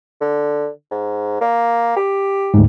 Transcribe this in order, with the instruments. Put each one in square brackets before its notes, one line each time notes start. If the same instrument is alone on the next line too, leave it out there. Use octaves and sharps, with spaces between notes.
[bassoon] D3
G#2
A#3
G4
[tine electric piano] D2 G#2